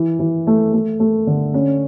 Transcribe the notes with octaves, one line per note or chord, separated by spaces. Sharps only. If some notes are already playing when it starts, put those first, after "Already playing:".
Already playing: E3
E3
A3
A3
A3
D3
C#4